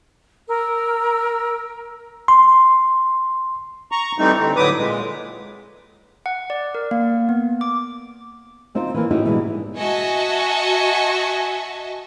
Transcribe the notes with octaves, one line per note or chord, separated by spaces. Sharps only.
A#4 E6
C6
A#5 C#6
E3 G3 A3 C4 D#4
D3 C4
A2 D3 F#3 B4 D6 D#6
A#2 G#3
F#5
D5
A#4
A#3
B3
D6
D2 C4 D#4 F4 C5
E3 A#3
A2 D#4 E4 F#4 G4
B2 E3 G3 G#3
F#4 D#5 E5 G#5 A5 C#6